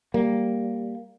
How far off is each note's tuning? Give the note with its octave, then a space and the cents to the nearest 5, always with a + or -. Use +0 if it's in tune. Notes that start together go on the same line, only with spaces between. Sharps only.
G3 +0 A#3 +0